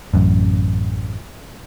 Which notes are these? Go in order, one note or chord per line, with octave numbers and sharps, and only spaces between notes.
A1 F#2